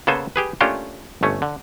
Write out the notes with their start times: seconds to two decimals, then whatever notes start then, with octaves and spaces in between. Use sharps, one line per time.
0.07 C#3 A#3 B3 A4 C5 G#5
0.36 G4 G#4 B4
0.61 A3 A#3 C#4 D4 F4 G4
1.23 G1 A3 C#4
1.42 D3